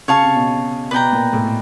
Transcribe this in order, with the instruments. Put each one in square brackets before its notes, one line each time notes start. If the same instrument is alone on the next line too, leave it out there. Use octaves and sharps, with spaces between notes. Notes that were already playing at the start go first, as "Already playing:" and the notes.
[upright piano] C#3 [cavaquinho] C#5 F5 A5 C#6
[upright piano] C3
B2
[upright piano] B2 [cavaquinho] B4 D5 G5 A#5
[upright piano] A#2
A2